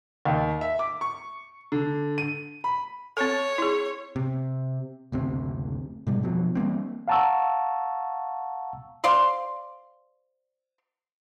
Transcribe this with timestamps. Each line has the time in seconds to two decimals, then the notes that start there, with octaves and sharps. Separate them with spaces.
0.25 D#2
0.61 E5
0.79 D6
1.01 C#6
1.72 D3
2.18 D#7
2.64 B5
3.17 C4 A4 C#5
3.58 E4 G#4
4.16 C3
5.12 F#1 D2 C3 C4
6.07 G#2 B2 G3
6.23 F2 B2 F3 F#3
6.55 E3 G3 A#3 C4
7.08 F5 F#5 A5 A#5 C#6 E6
9.04 C5 D5 F5 C6